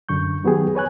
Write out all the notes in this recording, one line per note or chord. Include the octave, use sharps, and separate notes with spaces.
F#2 D3 C#6 G6
D#3 F#3 B3 G4 G#4
B4 C#5 G#5 F#6